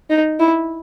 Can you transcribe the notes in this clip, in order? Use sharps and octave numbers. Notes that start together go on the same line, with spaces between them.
D#4
E4